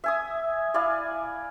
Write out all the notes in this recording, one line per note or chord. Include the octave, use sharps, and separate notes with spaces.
E5 G#5 D#6
E4 D5 F5 G#5